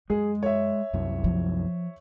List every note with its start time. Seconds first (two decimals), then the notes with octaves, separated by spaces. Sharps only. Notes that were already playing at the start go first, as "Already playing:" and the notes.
0.10 F#2 G#3 G#4
0.43 C#5 E5
0.94 C2 F#2 G#3
1.24 F3